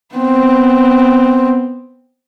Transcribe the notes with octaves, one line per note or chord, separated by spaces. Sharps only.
B3 C4